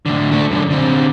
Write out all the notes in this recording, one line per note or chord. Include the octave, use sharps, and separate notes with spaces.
A2 D3
A3 D4
F#2 D3
D3 C4